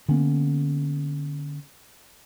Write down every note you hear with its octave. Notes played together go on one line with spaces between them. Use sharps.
D3 A#3 B3 C#4